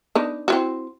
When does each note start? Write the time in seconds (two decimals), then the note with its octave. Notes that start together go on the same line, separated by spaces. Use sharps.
0.15 B3 D4 D#4
0.48 C4 E4 F#4